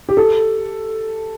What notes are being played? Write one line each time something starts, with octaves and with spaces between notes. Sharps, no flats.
G4
A4